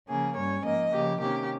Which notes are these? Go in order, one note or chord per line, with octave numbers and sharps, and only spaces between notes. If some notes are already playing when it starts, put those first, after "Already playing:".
C#3 F3 A#3 C#4 G#4
G2 G3 C#4 C#5
G#2 F3 A#3 D#5
C#3 F3 A#3 G4
C3 D#3 A#3 C#4 G4